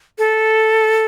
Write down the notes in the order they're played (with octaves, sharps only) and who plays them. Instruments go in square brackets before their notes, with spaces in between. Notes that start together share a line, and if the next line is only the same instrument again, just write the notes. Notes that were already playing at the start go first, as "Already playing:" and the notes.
[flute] A4